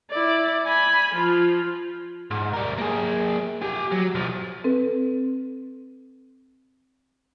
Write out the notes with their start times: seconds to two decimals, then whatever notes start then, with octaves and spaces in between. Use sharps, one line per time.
0.11 E4 D5
0.65 G#5 B5
1.14 F3 F4
2.31 G#2
2.53 G3 A#4
2.78 A#3 G#4
3.62 G4 G#5
3.92 F#3
4.15 B1 F3
4.64 C4 A4 B4